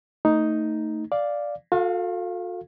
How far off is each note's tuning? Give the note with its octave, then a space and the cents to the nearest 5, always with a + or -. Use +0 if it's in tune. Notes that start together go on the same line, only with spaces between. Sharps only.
A3 +25 D#4 +5
D5 +0 F5 +0
F#4 -45 A4 +10 F5 +0